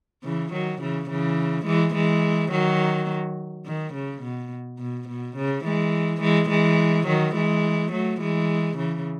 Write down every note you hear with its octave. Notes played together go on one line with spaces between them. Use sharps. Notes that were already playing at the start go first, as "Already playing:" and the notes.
C#3 E3
D#3 F#3
C#3 E3
C#3 E3
E3 G#3
E3 G#3
D#3 F#3
D#3
C#3
B2
B2
B2
C#3
E3 G#3
E3 G#3
E3 G#3
D#3 F#3
E3 G#3
F#3 A3
E3 G#3
C#3 E3